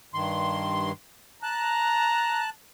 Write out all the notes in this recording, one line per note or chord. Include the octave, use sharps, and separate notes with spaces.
G2 D#3 C6
A5 A#5 F#6